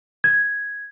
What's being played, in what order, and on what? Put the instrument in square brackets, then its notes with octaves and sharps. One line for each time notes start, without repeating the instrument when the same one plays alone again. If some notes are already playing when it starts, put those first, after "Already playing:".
[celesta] G#6